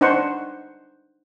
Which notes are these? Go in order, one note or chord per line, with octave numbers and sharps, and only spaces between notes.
D4 D#4 B4 C5 F#5 C#6